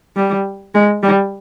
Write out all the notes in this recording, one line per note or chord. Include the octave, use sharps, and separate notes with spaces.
G3
G#3
G3